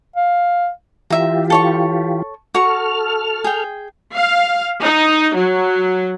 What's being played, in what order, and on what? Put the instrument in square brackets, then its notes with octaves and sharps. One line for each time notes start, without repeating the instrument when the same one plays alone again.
[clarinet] F5
[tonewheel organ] E3 F4 G4 [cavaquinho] A#4 E5
[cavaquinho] A4 C#5 C#6
[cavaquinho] F#4 C#6 [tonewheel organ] A4 F6
[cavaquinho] G#4 G5
[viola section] F5
D#4
F#3